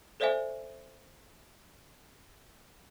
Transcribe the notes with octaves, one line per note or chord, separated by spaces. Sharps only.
A4 C5 D5 E5 F5 G#5